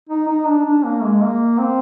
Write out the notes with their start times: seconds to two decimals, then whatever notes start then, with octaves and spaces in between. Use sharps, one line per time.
0.09 D#4
0.28 D#4
0.47 D4
0.65 D4
0.85 A#3
1.03 G#3
1.22 A#3
1.59 C4